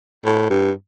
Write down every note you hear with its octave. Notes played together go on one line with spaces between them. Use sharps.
A2
G2